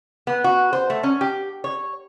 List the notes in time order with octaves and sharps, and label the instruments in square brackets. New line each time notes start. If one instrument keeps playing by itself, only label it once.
[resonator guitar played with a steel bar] B3
F#4
C5
A3
C#4
G4
C#5